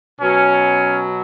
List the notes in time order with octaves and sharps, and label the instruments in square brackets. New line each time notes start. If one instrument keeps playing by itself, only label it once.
[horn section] B2 F#3 C#4